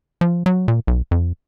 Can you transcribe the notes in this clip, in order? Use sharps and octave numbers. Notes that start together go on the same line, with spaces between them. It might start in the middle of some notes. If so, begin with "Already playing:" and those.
F3
F#3
A#2
B1
F2